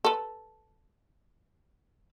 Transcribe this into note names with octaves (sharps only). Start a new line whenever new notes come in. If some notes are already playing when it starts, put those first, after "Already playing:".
A4 B4